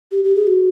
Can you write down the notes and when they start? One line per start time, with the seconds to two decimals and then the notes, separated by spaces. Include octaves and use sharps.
0.11 G4
0.24 G4
0.35 G#4
0.47 F#4